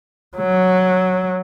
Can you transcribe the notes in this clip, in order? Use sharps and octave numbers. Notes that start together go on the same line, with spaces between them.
F#3